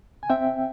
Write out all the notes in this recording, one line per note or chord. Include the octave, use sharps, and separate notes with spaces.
G#5
C4 E5 G5